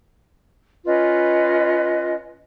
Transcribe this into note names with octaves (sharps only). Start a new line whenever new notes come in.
C#4 F4 B4 D#5